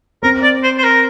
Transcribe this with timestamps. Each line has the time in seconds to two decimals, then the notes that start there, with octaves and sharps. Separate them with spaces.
0.23 C4 A#4
0.43 D5
0.63 C5
0.78 C5
0.84 A#4